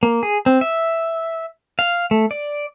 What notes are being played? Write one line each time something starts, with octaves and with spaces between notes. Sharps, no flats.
A#3
G#4
C4
E5
F5
A3
D5